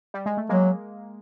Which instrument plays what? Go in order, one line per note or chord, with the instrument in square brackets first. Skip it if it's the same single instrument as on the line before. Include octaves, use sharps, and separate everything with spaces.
[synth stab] G3
G#3
A3
[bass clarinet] F#3 [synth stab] G#3 A#3